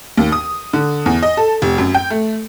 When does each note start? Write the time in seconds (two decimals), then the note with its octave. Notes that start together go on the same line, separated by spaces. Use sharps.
0.17 D#2
0.32 D#6
0.73 D3
1.06 E2
1.23 D#5
1.37 A4
1.62 F1
1.78 F#2
1.94 G5
2.10 A3